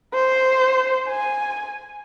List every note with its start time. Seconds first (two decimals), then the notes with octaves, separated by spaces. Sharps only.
0.14 C5
1.08 G#5